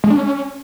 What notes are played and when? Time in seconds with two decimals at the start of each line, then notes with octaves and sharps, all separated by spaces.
0.04 G#3
0.10 D4
0.17 C#4